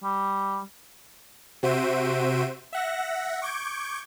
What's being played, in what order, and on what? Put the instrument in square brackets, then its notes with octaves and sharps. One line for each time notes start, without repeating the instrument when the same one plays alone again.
[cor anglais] G3
[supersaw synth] C3 F#4 C5 E5 D7 D#7
E5 F#5 A#6
C#6 D6 G6 G#6 D7